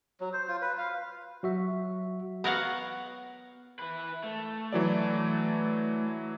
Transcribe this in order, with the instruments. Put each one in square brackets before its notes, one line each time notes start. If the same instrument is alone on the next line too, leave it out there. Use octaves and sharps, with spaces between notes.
[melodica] F#3
C5
F4
B4
F5
[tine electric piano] F#3 F#4 E5
[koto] B3 A#4 C#5 F5 F#5
[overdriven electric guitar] E4 B4
A3
[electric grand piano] E3 F#3 D5